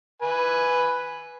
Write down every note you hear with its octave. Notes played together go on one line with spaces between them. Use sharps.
B4 G#5